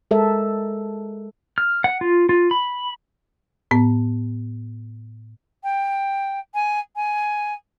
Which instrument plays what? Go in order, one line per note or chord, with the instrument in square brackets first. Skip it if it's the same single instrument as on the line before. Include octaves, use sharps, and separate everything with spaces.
[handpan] G#3 A4 A#4 E5
[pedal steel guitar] F6
F#5
F4
F4
B5
[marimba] A2 B3
[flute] G5
G#5
G#5